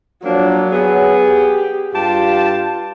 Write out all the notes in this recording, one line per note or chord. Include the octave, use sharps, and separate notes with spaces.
F3 F#3 A#3 D4
B3 G#4
G4
G2 F4 G4 A5